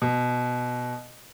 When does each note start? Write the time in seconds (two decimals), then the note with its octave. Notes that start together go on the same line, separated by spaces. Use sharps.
0.02 B2